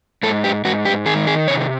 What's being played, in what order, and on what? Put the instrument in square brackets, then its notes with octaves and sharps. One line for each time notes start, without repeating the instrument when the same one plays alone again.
[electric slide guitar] G#2 A4
G4
G#2 F#4
G4
D#3 G#4
G#4
C3 C#5